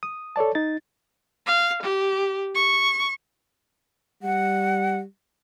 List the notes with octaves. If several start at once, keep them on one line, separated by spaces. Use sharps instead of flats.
D#6
A4 C#5 D5 A5
D#4 A6
F5
G4
C#6
G3 F#5